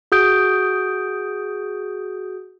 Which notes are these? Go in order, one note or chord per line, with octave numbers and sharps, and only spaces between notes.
F#4 G#4 D#6 G6 D7